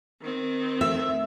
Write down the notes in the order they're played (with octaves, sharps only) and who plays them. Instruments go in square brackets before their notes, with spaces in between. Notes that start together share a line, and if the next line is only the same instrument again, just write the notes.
[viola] D#3 C4
[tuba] A3 [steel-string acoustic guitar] E5